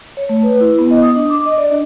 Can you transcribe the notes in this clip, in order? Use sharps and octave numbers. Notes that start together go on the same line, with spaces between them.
C#5
A3
B4
E4
B3
D#5
D#6
D4
D6
D#5
D5
D4